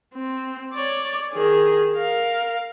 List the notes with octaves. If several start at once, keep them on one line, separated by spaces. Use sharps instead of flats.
C4
C#5 D5
D#3 G#4
A#4 F5